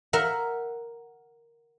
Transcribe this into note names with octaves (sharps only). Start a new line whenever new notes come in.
A#4 E5 F#5